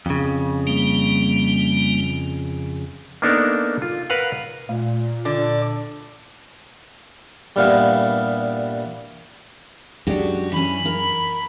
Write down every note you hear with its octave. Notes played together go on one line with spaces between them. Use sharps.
F2 C#3
G3 A#3
A#3 B3 D4 D#4 A4 A#4
F4
A#4 B4 F5 F#5
A#2 A3
D3 D5
G2 A#2 G3 B3 E4 F5
F#2 G#3 D4 F#4 G4
E3 C#4 B5
A#4